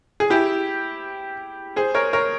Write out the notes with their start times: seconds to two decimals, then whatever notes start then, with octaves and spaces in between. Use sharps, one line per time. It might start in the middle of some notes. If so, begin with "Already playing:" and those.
0.20 G#4
0.30 E4 G4
1.76 G#4 C5
1.95 A#4 C#5
2.13 A#4 C#5